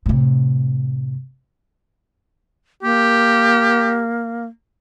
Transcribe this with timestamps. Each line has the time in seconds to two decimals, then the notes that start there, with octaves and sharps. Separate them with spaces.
0.06 A2 C3
2.83 A#3 G4